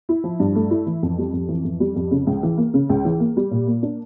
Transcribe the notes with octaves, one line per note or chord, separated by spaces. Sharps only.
E4
F3
G2
A3
E4
E3
F2
G3
F2
E3
F2
G3
F2
C#3
C#2
E3
A#3
C#3
C#2
E3
A#3
G3
A#2
A#3
D4